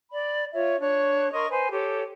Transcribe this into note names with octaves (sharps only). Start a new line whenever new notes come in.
D5 B5
F4 C#5 E5
D4 C#5 F#6
A#4 D#5 C6 C#6
B4 C5 G#5
G4 A4 C#5